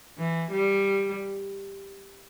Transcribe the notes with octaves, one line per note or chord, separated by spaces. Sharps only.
E3
G3